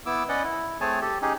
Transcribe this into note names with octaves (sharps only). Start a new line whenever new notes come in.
B3 E4 D6 E6
C#4 B4 D5 D#5 F#5
E4
A3 C4 G#4 C#5 G#5 A5
G4 A4
C#4 D#4 G4 G#4